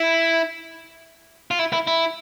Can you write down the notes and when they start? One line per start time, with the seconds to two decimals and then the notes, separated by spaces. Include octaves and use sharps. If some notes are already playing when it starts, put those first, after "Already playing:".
Already playing: E4
1.51 F4
1.59 E4
1.73 E4
1.87 E4